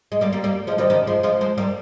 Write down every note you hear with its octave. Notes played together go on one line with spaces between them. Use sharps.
G#3
G3 A#3
G3 A#3
G3 A#3
F3 G#3
D#3 G3
D#3 G3
F3 G#3
F3 G#3
G#3 C4
G3 A#3